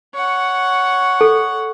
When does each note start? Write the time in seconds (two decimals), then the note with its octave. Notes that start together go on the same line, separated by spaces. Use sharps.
0.14 C#5 F#5
1.21 A4